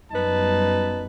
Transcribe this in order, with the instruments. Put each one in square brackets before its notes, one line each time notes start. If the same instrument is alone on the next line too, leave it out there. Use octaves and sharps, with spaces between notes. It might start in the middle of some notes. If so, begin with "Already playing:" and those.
[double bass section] F#2 G3 B3 [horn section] D#4 B4 A5